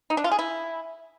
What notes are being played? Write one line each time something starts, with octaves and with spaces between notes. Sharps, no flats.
D#4
D4
F4
G#4
E4